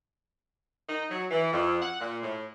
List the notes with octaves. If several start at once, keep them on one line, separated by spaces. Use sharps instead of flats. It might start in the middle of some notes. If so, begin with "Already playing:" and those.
D#4
F#3
E3
F2
F#5
A#2
A2